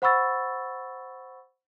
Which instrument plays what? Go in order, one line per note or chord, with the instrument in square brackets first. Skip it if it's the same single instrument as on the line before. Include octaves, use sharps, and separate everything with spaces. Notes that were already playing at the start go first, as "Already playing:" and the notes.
[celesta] C5 F#5 B5 C#6 E6 A6